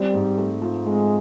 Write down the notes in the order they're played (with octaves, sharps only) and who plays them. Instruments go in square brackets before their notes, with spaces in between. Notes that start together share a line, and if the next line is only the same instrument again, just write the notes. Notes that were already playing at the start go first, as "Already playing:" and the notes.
Already playing: [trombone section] G3 [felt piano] C4
[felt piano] G#2
A3
F3
[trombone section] G#3 [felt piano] C4